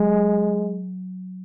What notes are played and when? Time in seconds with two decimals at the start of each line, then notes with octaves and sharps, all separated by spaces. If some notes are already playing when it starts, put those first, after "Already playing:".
Already playing: F#3 G#3